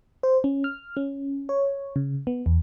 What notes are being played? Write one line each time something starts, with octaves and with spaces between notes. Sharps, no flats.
C5
C#4
F6
C#4
C#5
C#3
B3
E2